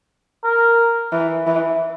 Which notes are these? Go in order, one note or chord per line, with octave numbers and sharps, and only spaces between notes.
A#4
E3
E3